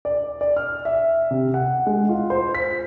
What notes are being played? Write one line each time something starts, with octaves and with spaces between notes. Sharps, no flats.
D5
D5
F6
E5
C3
F#5
G#3
F4
C5
B6